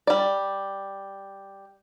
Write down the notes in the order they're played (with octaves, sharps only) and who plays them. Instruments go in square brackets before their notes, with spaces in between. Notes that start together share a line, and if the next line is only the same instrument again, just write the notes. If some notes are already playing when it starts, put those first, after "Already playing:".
[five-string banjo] G3 D5